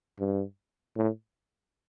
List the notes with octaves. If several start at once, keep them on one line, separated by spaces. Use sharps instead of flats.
G2
A2